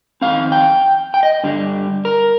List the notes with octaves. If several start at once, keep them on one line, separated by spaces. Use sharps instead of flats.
F2 D#3 G3 C4 F5
G5
G5
D#5
G2 D3 G3 D4
A#4